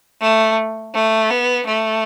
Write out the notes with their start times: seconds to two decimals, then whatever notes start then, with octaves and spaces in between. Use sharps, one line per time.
0.21 A3
0.94 A3
1.30 B3
1.67 A3